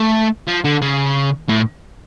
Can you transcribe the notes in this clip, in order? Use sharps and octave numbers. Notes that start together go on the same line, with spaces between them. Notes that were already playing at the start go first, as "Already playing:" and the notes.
Already playing: A3
F3
D3
C#3
A2